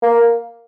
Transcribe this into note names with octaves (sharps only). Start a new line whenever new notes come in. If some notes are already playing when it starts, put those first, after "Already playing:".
A#3